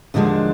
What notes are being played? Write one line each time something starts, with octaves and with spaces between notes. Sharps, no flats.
D#2 D3 F3 G#3 D4